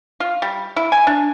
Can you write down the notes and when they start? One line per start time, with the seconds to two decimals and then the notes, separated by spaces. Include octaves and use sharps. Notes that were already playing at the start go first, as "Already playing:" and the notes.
0.20 F4
0.42 G3
0.76 E4
0.92 G#5
1.07 D4